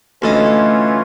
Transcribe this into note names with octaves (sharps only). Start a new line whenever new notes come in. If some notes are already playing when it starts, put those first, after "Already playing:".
D2 E3 C#4 F4 A4 D#5